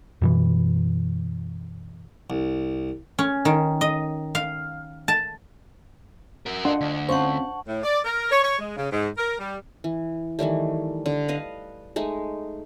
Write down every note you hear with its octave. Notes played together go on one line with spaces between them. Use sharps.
F#2 B2 E3
C2
C#4
D#3
D#5
F5
A5
F#4 A#4
D4 F4 D#5 F#5 C6
D2
C4 C#4 F4 C5 F#5 A5 C#6
A2
D5
A#4
C#5
C#5
G#3
C#3
G#2
A#4
G3
E3
D#3 E3 G3 A3
D3
B4 D#5 F5
G#3 A3 D#4